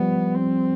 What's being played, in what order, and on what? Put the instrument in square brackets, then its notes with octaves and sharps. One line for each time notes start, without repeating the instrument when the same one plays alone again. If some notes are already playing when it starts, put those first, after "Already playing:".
Already playing: [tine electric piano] F3 G3 [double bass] B3
[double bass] C4